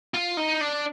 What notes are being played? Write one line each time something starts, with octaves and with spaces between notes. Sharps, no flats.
F4
D#4
D4